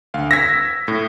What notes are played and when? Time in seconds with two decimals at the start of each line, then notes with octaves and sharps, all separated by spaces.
0.14 D2 F5
0.31 E6 G#6 A#6 B6
0.88 A2